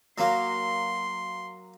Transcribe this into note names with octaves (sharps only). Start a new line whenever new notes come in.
F#3 A#3 C6